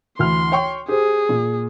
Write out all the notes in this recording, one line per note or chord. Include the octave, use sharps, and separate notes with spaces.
D2 E3 C6 F6
C#5 G5 C#6
G4 G#4 C5
A#2